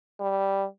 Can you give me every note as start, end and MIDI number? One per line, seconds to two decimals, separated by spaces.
0.20 0.65 55